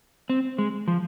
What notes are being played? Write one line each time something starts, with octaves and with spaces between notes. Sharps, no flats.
C4
G#3
F3